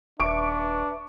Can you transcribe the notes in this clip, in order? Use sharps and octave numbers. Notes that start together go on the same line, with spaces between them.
D#1 D4 B4 E5 C#6 D6 D7